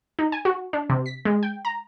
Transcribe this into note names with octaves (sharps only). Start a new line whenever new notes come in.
D#4
G#5
F#4
D4
C3
B6
G#3
G5
A#5